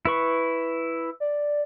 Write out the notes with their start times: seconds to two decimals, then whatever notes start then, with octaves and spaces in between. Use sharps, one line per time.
0.05 E4 B4 C#6
1.20 D5